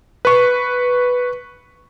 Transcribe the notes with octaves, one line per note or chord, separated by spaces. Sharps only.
B4 C#6